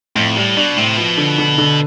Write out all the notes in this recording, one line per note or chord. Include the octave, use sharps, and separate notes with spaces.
F2 A2
A2 G3
B2 D4
A2 C3
B2 F3
D3
D3
D3